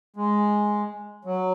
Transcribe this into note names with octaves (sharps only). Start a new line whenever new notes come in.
G#3
F#3